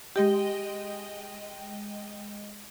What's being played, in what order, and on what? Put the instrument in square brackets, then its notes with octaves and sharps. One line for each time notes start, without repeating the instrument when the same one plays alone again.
[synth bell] G#3 D#5 G5 [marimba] G4